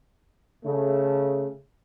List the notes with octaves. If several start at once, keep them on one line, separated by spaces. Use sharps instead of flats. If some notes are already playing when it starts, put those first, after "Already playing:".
C#3 A3